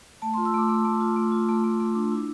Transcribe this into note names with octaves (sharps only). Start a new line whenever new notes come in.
A3 A5
F4 C6
E6
A3 D6
A3 D6
A3
F4
A3
F4
A3
A3
A3
D4
E4